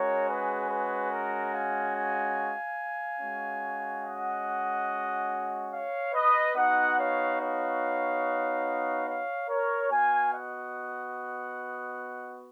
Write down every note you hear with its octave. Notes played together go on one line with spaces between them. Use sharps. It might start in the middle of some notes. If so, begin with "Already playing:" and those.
Already playing: G#3 C#4 F#4 A#4 C#5
G#4 B4
G#4 B4
A#4
F5 G#5
F5 G#5
G#3 C#4 F#4
D#5 F#5
C#5 F5
B4 D#5
B3 D#4 F#4 D#5 F#5
C#5 F5
C#5 F5
C#5 F5
A#4 C#5
B3 F#4 F5 G#5
D#5 F#5